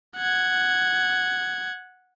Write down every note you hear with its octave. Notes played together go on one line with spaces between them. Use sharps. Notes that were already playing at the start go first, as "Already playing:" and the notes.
F#5 G#6